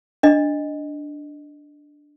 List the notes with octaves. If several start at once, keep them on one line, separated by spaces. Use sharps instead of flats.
D4 D#5